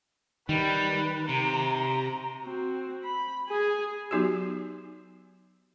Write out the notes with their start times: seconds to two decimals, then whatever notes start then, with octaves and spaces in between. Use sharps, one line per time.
0.49 D#3 G3 B4
1.29 C3 A#5
2.44 C4 F#4
3.04 B5
3.49 G#4 G#5
4.11 F#3 B3 D#4 F#4 G4